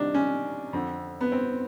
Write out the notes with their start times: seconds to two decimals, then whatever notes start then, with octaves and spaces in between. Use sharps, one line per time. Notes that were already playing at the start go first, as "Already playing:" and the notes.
Already playing: C2 C3 D#3 D4
0.15 C#4
0.73 F2 D3
1.21 B3
1.32 C4